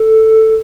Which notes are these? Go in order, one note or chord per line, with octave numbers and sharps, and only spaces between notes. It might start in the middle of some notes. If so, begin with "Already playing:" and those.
Already playing: A4